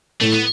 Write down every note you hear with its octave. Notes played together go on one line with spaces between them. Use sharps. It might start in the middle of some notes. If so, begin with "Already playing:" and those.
A2 A3
B3